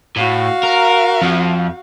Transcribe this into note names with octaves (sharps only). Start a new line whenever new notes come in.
A2 F#4 F5
A#4
F2 F3